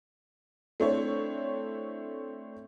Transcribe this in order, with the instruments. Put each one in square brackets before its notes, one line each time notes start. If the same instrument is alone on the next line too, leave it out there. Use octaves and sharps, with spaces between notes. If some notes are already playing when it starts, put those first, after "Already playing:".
[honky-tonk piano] A3 C4 D4 E4 C#5